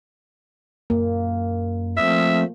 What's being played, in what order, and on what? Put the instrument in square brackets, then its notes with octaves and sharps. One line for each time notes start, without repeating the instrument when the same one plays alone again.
[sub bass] F#2 [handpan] A#3
[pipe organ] F3 A3 C4 [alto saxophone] E5